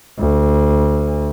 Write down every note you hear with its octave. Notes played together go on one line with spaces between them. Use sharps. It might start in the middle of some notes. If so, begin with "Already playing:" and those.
D2